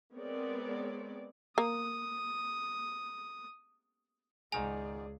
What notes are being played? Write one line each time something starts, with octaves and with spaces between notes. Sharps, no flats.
G#3 B3 C4 A#4 C#5 D5
A#3 D#6
C#2 G#2 D#3 G#4 D5 G#5 A#5